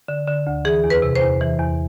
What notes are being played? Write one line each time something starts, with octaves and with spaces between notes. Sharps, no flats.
D3
D3
D2
E3 G#4
E2
B4
C3
C5
E2
E3
E2